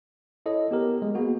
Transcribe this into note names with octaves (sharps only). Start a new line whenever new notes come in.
E4 A4 C#5 D#5
B3 G4 A#4
G#3
A#3 B3 F#4 G#4